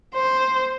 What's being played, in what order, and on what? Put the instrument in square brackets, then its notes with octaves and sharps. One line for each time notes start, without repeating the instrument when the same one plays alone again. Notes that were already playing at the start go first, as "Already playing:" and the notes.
[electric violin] C5